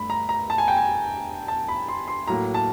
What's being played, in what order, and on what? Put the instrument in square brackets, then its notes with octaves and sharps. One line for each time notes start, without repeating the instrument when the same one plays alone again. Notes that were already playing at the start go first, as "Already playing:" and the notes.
Already playing: [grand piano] G2 A3 B5
A#5
A#5
A5
G#5
G5
G#5
A5
B5
C6
C6
A2 F#3 A#3 A#5
A5